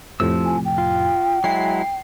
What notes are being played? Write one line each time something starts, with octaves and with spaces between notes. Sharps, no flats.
F2 A2 C3 F3 E6
G#5
G5
F4
F#3 G#3 E4 C7